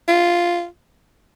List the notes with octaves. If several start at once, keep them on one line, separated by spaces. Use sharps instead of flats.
F4